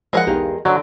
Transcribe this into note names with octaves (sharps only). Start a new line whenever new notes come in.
F3 F#3 G#3 A#4 D#5 F#5
B1 E2 D#4 G4 A#4 F5
D3 F#3 D5 C6 E6 G6